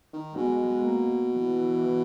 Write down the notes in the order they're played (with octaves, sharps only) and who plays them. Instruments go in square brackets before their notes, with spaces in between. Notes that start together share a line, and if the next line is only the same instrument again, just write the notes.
[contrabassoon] D#3
[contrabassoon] B2 [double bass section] G#3
[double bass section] A#3
E3